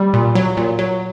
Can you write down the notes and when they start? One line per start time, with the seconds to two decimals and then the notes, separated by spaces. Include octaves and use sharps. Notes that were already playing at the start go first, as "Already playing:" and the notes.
Already playing: G3
0.14 A#2
0.35 F#3
0.57 A#2
0.79 F#3